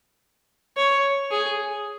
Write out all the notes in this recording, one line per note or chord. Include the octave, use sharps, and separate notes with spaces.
C#5
G#4